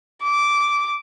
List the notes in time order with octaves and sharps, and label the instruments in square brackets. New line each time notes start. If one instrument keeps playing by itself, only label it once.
[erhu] D6